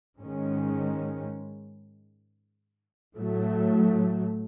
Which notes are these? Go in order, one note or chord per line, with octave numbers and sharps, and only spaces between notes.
G#2 D#3 G#3 C#4
A2 F#3 A3